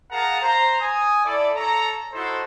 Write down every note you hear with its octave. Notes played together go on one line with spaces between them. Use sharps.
G#4 A#4 F5 F#5 A5 A#5
C5 A#5
G#5 D#6
E4 A4 D5
A4 C#5 A#5
D#4 E4 F#4 A4 C5